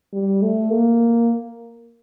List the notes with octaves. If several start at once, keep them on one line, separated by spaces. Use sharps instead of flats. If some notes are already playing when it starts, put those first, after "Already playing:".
G3
A3
A#3